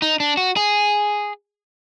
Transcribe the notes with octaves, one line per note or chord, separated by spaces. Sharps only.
D#4
D4
F#4
G#4